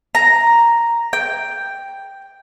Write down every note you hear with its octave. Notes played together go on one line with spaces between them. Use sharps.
A#5
G5